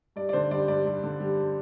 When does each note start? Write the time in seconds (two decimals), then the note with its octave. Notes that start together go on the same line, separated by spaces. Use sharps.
0.16 G2 D5
0.29 D5
0.33 D3 C5
0.51 G3 D5
0.68 G2 D5
0.86 G2
1.04 D3
1.20 G3